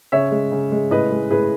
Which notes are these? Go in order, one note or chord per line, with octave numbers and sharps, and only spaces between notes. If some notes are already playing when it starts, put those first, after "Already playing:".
C#3 C#5 E5
G#3
C#3
G#3
A2 B4 D#5
G#3
A2 G#4 B4